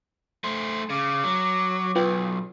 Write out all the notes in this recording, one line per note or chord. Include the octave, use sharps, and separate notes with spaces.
A3 C5
C#3 D6
F#3
B1 F4 B4 G5